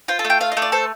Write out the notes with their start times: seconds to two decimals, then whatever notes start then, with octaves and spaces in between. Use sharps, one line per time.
0.08 F4 C5
0.19 A4
0.25 A3
0.30 G5
0.41 F4 F5
0.52 D#5
0.57 A3
0.62 D5
0.72 A4 C5